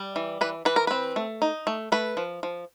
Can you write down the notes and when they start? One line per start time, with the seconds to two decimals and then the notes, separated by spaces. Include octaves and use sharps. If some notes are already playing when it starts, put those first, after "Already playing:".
Already playing: G3
0.16 E3
0.41 E3 B4
0.65 E3 B4
0.76 A#4
0.87 C4 B4
1.16 A3
1.42 D#4
1.67 A3
1.92 A3 B4
2.17 F3
2.43 F3